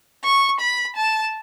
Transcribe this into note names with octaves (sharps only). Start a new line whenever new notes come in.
C#6
B5
A5